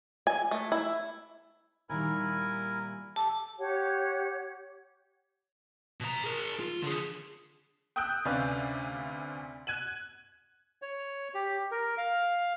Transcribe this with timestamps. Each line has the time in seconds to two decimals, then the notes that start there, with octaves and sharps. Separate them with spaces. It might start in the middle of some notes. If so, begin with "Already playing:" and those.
0.27 G#5
0.51 A3
0.72 E4
1.89 A#2 D#3 G3 E4 A#4 G#5
3.16 G4 A4 A5
3.58 G4 C#5 F#5
6.00 B2 A#5
6.24 G#4 A#4
6.60 F4
6.83 D3 G#4
7.96 G5 D#6 E6 F#6 G6 D7
8.25 D2 C3 C#4 B4 D5 F5
9.67 F#6 G#6 D#7 F#7
10.82 C#5
11.34 G4
11.72 A#4
11.98 F5